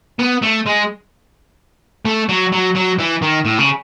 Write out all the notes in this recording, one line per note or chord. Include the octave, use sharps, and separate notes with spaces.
B3
A3
G#3
A3
F#3
F#3
F#3
E3
D#3
A2
C#3